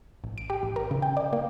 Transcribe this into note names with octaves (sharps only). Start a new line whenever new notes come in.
A1
D7
G4
A1
A#4
C#3
G5
D5
A#3